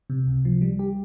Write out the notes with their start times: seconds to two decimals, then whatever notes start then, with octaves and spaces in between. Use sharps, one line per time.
0.10 C3
0.27 C#2
0.45 F3
0.61 G3
0.79 G4